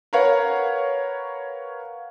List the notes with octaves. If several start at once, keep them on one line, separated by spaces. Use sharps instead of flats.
A#4 B4 C#5 F5 F#5